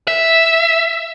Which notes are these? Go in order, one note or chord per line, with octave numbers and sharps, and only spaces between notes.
E5